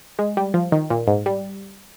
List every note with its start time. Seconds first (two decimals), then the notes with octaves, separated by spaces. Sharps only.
0.19 G#3
0.37 G3
0.54 F3
0.72 D#3
0.90 A#2
1.07 G#2
1.26 G3